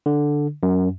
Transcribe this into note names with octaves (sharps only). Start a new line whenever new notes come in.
D3
F#2